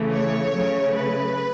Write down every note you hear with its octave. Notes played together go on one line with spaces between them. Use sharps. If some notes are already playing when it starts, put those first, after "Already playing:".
Already playing: C#3 E3 A3
C#5
C#3 F#3 A3
B4